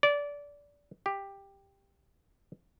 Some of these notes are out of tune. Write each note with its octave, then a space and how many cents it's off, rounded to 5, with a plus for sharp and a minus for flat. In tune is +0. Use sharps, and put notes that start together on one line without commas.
D5 -20
G4 +10